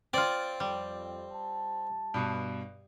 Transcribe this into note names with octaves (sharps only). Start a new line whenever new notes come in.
C4 F4 D5
F2 G3
A5
G2 B2